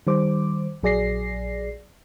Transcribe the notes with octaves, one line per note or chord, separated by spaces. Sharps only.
D#3 G3 C5 D6
A#1 F#3 G#4 D5 A#6 C7